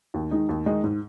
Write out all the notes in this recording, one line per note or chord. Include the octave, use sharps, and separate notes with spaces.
D#2
D#3 G#3 D#4
D#2
D#3 G#3 D#4
G#2